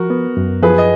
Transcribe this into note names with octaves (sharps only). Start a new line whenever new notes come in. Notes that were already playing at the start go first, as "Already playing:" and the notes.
Already playing: F3 F#4 A#4
B3
F#2
F3 G#4 B4
D#5